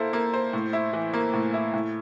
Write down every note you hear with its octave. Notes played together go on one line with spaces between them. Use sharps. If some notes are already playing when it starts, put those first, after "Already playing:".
Already playing: A#3 E4 A4 C5
A#3
C5
A2
E4
E3
A#3
A2
E4
A2